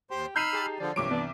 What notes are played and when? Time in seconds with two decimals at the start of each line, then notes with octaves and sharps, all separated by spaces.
0.11 D#2 G4 C5 C6
0.36 D#4 B5 E6 F6 G6 C7 D#7
0.53 G4 G#4 A5
0.80 D3 F3 D5
0.96 C2 G2 F3 G3 A3 C#5 D6 D7
1.11 E3 B3 D4